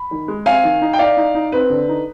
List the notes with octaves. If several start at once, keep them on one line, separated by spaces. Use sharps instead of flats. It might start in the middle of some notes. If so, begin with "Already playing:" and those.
Already playing: B5
D#3
G#3
C4 F5 G#5
D#3
D#4
G5
D#4 D5 F5
D#4
D#4
C4 B4
D3
D#4